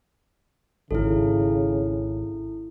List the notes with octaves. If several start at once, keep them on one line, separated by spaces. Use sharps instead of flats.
G#1 C#3 E4 A4